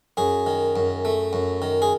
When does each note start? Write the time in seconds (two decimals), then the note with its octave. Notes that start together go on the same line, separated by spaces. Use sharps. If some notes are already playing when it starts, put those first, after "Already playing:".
0.17 F#2 G#4
0.46 D#3
0.76 F#2
1.05 A3
1.33 F#2
1.62 D#3
1.82 G#4